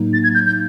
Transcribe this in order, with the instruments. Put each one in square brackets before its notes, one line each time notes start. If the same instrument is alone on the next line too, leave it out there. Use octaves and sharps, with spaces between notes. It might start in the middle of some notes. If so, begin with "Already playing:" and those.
Already playing: [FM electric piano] A2 F#3 A#3 D#4
[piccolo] A6
G#6
G6
G6